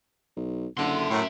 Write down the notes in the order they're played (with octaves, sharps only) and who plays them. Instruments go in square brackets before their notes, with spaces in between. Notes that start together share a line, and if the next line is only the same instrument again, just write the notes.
[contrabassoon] B1
[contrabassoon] F#1 [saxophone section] D3 [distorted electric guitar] E5 C6
[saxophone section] F#2 A2